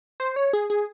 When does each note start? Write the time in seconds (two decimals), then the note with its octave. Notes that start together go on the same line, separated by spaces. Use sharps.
0.20 C5
0.36 C#5
0.53 G#4
0.70 G#4